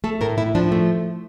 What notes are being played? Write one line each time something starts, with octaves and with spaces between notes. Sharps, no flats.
A3 A4
A2 A#4
A2 E4
F3 D4
A3